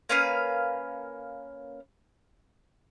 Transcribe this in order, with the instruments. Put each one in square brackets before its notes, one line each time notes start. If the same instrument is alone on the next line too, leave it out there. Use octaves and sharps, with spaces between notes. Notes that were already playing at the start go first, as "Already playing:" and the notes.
[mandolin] A#3 C#4 B4 F5